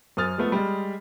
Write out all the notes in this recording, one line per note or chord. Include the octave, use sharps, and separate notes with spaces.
F#2 C5 D#6 F6 A6
F3 G#3 A3 B3
G3 G#3